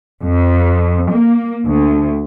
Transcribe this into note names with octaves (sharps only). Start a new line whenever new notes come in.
F2
A#3
D2